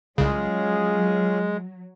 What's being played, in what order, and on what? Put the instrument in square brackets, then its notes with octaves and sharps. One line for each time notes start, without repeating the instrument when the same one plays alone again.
[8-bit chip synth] C2 C#3 [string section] F#3 [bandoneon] G#3 [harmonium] C#4 F4 G#4